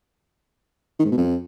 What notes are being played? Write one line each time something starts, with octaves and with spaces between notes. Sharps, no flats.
D#3
G#2
B2
F2